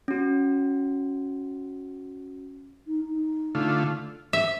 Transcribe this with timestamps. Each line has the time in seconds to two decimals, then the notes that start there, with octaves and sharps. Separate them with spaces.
0.08 C#4 F#4
2.87 D#4
3.09 D#4
3.55 D3 A3 F4
4.33 E5